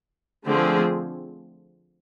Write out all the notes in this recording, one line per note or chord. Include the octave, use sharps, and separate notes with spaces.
D3 F3 A3 C4 G#4